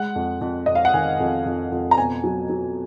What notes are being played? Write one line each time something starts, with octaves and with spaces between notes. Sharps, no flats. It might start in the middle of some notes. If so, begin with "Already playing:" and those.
Already playing: G#3 F#5
F2
F2
F2 D#5
F5
F#5
D#3 G#5
F2
F2
F2
A#5
B2 G#5
F#3
F#3